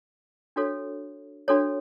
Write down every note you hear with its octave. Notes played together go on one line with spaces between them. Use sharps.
D4 F#4 A4 C#5
D4 F#4 A4 C#5